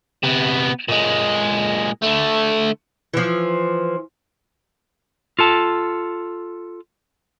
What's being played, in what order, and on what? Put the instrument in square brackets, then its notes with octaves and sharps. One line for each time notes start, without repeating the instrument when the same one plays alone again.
[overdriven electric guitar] C3 B3
A#2 G#3
D3 A3
[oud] E3 F3
[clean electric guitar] F4 A4 A5